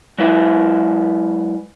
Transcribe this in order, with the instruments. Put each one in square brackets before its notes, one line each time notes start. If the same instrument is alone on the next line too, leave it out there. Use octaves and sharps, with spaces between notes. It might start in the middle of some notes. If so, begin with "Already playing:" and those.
[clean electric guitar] F#3 G#3 E4 B4 E5